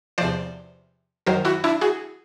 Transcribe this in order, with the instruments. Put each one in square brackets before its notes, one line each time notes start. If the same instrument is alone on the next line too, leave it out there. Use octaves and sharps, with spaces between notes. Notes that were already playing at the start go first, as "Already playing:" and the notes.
[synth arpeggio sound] E2 C3 F3 C5 D5
F#2 D#3 F#3 A#4 C5
E4 F#4
D4 E4
F#4 G#4